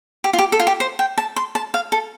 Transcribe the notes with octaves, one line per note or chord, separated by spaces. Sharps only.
G4
F4
G4
A4
F4
G4
C5
G5
A5
C6
A5
F5
A4